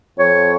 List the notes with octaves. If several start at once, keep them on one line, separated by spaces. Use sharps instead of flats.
F2 C#5